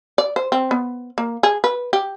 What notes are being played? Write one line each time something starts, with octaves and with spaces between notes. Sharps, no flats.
D5
C5
C4
B3
A#3
G#4
B4
G4